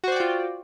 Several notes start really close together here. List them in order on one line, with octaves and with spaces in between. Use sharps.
F#4 C5 D5 G5 F4